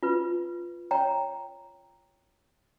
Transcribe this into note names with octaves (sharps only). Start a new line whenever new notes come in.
F4 B4
C#5 G5 A#5